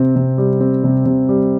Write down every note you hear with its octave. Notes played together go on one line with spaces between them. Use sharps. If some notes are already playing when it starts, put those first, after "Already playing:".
Already playing: C3 C4
C3
G3
C4
C3
C3
G3